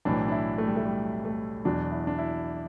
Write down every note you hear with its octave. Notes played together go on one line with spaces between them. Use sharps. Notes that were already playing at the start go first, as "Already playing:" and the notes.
B1 A2 E3 D4
D4
E4
A3
G3
A3
G3
A3
E2 B2 F#3 D4
E4
D4
E4